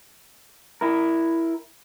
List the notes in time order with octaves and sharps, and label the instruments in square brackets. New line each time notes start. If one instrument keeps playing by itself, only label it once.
[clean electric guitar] E4 A#4